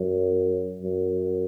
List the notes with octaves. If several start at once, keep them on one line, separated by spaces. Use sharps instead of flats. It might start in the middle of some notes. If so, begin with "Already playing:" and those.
Already playing: F#2
F#2